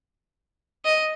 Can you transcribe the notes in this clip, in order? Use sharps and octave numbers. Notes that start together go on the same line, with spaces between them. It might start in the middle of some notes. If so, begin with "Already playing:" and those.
D#5